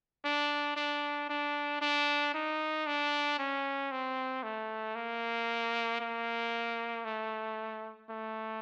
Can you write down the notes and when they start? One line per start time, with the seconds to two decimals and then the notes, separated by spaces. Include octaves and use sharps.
0.25 D4
0.77 D4
1.30 D4
1.81 D4
2.34 D#4
2.87 D4
3.39 C#4
3.92 C4
4.43 A3
4.95 A#3
6.01 A#3
7.05 A3
8.10 A3